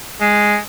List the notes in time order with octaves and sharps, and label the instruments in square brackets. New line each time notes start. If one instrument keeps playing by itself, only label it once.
[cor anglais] G#3